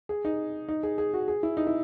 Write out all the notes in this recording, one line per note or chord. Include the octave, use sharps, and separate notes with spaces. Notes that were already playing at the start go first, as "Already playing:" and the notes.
G#4
D#4
D#4
G#4
G#4
F#4
G#4
E4
D#4
E4